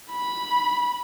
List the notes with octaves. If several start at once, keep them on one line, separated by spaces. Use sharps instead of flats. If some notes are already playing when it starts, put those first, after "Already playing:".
B5